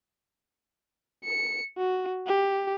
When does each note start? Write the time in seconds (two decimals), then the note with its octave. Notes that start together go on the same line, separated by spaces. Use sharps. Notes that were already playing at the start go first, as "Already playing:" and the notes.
1.24 C#7
1.78 F#4
2.27 G4